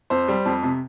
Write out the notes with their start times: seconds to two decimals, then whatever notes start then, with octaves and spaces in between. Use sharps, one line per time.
0.10 F2 C5
0.28 G3
0.45 F2
0.63 C3